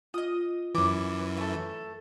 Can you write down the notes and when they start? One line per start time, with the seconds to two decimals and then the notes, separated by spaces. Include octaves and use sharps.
0.14 F4 D#5 D#6
0.75 F#2 E3 D6
1.37 A3 A4